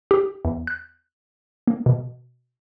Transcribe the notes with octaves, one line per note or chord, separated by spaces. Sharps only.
G4
E2
F#6
A#3
B2